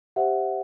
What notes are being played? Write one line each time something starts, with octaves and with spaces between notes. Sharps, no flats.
G4 C5 E5 F#5